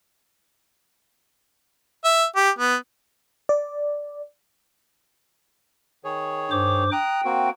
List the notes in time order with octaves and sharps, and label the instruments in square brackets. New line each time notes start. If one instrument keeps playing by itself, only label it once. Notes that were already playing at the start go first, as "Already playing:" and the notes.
[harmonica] E5
G4
B3
[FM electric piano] D5
[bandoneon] D#3 G#4 C#5
[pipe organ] G2 C5 D6
[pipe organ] G5 [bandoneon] A#5 D#6 F#6
[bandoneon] A#3 C4 F#4